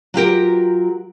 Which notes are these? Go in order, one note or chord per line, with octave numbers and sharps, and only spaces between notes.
F#3 F4 G4 A#4